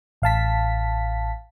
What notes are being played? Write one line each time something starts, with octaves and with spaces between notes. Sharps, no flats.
A1 F5 A5 B6